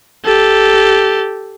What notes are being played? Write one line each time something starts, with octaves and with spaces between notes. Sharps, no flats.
G4 A4